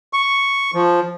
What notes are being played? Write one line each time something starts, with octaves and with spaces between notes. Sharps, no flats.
C#6
F3